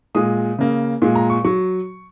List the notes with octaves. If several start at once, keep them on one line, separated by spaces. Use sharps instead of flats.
A#2 G#3 D#6
C#3 A#3
A#2 G#3
A#5
C#6
F#3 C#6